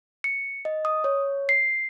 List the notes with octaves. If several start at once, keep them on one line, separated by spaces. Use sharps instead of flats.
C#7
D#5
D#6
C#5
C7